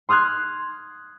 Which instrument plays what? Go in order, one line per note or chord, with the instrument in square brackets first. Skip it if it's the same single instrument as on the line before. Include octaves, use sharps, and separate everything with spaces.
[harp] C6 D#6 F6 F#6 G#6